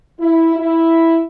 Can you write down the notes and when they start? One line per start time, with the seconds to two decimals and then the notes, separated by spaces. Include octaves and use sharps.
0.19 E4
0.56 E4